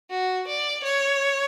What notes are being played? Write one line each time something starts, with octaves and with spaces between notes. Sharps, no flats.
F#4
D5
C#5